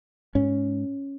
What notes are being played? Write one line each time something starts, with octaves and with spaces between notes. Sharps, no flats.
G#2 C#4